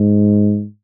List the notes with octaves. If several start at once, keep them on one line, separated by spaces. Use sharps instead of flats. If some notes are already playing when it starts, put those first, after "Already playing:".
Already playing: G#2